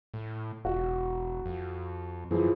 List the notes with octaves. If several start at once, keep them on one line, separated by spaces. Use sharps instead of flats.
A2
E1 F#4
F2
F#2 E3 F3 G#4